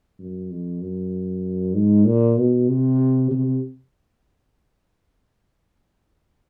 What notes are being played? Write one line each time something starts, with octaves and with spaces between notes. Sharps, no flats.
F#2
F2
F#2
G#2
A#2
B2
C3
C3